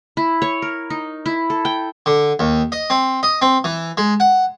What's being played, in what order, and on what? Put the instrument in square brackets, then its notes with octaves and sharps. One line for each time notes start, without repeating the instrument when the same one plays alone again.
[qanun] E4
C#5
A#4
D#4
E4
A4
G5
[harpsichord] D3
D#2
D#5
C4
D#5
C4
E3
G#3
F#5